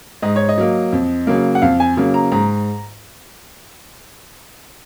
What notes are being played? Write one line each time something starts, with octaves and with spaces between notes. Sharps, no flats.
G#2 D#5
C#5
D#5
F#3 A#3
F2
C#3 F#3 A#3
F#5
F2 F5
G#5
C#3 F#3 A#3
A#5
G#2 A#5